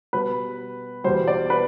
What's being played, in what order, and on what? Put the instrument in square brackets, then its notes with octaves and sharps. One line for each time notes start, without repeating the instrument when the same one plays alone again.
[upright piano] B2 G3 B4
E2 B2 G3 C5
D5
B4